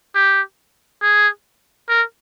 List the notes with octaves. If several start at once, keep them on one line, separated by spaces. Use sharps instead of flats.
G4
G#4
A#4